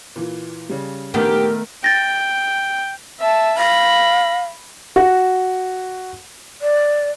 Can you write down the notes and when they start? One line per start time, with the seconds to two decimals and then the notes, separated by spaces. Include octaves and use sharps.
0.16 A#2 E3
0.69 C#3 G3
1.14 A#1 D#3 A3 B3 G4 A#4
1.84 G5 A6 A#6
3.19 E5 A5
3.57 F5 B5 A#6
4.96 F#4
6.62 D5